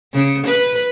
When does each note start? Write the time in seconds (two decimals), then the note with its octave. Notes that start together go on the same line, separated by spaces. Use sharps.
0.13 C#3
0.47 B4